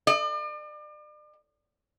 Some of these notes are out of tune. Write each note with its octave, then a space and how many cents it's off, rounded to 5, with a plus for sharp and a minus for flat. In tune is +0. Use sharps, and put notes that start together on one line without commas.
D5 +40